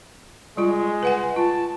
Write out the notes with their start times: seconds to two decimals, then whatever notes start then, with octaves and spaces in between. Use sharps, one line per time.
0.57 G3 G#3 F4
1.03 B4 F#5 G#5
1.36 F4 A5